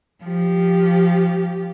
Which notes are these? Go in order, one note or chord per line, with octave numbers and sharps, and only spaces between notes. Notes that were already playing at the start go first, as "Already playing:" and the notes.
F3 G4